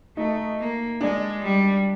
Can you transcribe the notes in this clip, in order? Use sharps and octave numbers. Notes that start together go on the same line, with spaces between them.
A3 D#4
A#3
G#3 D4
G3